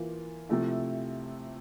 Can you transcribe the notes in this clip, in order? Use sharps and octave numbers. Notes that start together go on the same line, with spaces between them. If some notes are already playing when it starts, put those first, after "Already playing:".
Already playing: E3 A#3 F4
C3 F3 A3 E4